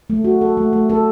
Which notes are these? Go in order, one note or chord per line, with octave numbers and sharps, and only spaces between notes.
A3
F#4
A4
A3
A3
A4